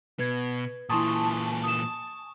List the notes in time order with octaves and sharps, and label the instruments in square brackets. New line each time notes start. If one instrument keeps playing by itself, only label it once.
[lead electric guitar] B2 [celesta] B4 G#6
[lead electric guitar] A#2 E3 [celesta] E4 C6 D#6 [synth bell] G#5 A5 C#6
[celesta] D#6 E7